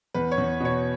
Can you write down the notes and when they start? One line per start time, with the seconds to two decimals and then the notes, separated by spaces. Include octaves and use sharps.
0.14 E2 B4
0.32 C#5
0.38 E2
0.60 B2 C#5